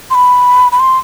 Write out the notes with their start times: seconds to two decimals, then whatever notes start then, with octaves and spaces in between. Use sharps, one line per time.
0.10 C6
0.15 B5
0.72 B5
0.80 C6